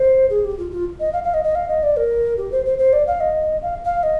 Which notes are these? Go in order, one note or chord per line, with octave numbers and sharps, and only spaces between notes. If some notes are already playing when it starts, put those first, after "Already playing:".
Already playing: C5
G#4
G4
F4
F4
D#5
F5
F5
D#5
D#5
F5
D#5
D5
A#4
G4
C5
C5
C5
D5
F5
D#5
F5
F5
D#5